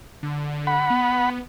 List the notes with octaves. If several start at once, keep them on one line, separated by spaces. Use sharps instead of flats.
D3
F#5 B5
B3